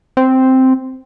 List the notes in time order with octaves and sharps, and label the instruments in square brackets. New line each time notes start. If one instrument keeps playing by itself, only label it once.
[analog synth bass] C4